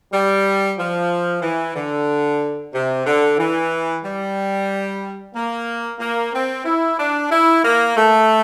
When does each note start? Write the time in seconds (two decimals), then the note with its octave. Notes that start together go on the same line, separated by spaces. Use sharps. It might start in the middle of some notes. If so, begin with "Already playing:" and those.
0.12 G3
0.78 F3
1.42 E3
1.75 D3
2.73 C3
3.06 D3
3.38 E3
4.04 G3
5.34 A#3
5.99 A#3
6.33 C4
6.65 E4
6.98 D4
7.30 E4
7.63 A#3
7.95 A3